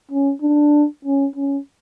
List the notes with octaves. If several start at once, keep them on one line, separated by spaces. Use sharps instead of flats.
C#4
D4
C#4
C#4